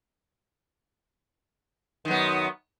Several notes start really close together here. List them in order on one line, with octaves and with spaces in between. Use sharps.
D#3 F#2 B3